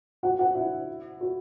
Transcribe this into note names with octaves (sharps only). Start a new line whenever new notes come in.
F#4 F#5
F#4 F#5
E4 E5
F#4